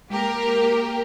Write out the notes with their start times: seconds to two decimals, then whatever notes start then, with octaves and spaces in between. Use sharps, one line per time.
0.10 G#3 A#3 G4 A#4